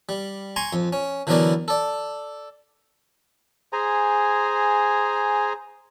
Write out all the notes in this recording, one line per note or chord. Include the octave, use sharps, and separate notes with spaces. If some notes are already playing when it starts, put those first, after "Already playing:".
G3
G#5 A#5 C6 C#6
F2
C#4
D3 E3 F#3 B3 A#4 D5
A4 D5
G#4 C5 G#5 A#5